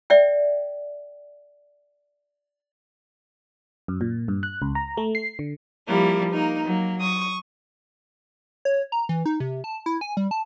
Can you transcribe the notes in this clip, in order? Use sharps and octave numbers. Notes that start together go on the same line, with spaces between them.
D5 E5 G5
F#2
A#2
G2
F#6
C#2
A#5
A3
C7
D3
F3 G3 A#3 E4
A#3 D#4
F#3 A#3
C#6 D#6
C#5
A#5
E3
D#4
C3
A5
E4
G#5
G3
A5